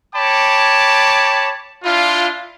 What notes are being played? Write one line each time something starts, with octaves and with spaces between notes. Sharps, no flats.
C#5 G5 A5 B5 D6
D4 E4 F4